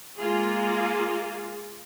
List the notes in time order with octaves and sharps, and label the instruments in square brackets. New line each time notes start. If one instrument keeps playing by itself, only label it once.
[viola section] G#3 A#3 F4 G#4